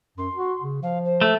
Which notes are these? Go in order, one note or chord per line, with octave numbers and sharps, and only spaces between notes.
F#2 C6
F#4
C#3
F3 F5
C5
A3